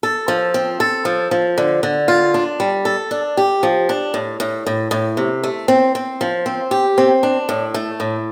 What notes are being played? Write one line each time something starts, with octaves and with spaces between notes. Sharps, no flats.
A4
F3
C4
A4
F3
F3
D3
D3
F4
D4
G3
A4
D4
G4
F3
D4
A2
A2
A2
A2
C3
A3
C4
C4
F3
C4
G4
C4
D4
A2
A3
A2